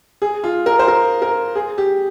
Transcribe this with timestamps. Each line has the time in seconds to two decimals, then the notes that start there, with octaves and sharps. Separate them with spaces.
0.22 G#4
0.44 F4
0.66 A#4
0.79 C5
0.88 A#4
1.22 A#4
1.55 G#4
1.78 G4